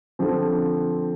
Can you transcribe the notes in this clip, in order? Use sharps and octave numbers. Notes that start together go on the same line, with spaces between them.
D3 F3 C4